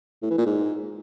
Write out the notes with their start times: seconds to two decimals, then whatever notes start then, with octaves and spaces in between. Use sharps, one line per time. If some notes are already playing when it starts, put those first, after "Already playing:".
0.22 A2
0.30 E3
0.38 A#2
0.47 G#2